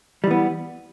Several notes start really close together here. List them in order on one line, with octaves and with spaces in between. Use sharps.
G3 E3 B3